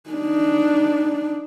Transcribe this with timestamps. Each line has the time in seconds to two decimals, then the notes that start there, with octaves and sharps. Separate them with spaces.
0.10 D4 D#4